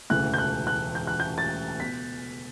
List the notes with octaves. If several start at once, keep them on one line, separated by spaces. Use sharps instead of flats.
E1 D2 C#3 E3 F#6
G6
F#6
F#6
G6
F#6
G6
A6
B2 B6